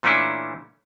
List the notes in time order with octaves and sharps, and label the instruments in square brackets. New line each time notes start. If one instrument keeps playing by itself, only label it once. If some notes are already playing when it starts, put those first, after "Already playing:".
[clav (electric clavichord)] A#2 E3 A3 C#4 D4 E4